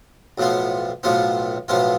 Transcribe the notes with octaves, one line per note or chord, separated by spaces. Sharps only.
B1 A2 F3 B3 F4
B1 A2 F3 B3 F4
B1 A2 F3 B3 F4